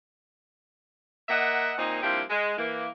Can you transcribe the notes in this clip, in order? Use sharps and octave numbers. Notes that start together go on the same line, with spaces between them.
A#3 A#4 D#5 E5 F#5
A#2 A#3 C4 D#4
F3 G3 A#3 C4 D4 E4
G#3
E3 A#3